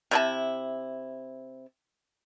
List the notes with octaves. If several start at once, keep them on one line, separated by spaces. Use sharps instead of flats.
C3 E4 A5